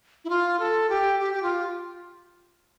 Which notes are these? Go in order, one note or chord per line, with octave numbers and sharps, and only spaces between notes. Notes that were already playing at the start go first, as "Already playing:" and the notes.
E4
F4
A4
G4
G4
G4
F4